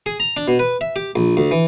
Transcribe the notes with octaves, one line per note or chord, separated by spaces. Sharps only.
G#4
A#5
D4
B2
B4
E5
G4
A#1
D2
E3